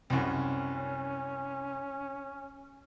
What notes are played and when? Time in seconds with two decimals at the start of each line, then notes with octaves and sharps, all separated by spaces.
0.10 C2 F#2 C#4